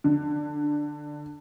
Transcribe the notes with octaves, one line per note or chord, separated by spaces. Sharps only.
D3